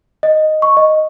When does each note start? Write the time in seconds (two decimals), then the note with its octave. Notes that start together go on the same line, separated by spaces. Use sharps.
0.23 D#5
0.62 C#6
0.77 D#5